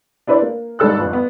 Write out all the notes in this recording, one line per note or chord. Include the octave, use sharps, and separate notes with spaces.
D4 E4 B4 C5 D5
A#3
G#1 G#2 G3 A4 E6 F#6
G1 F2
B3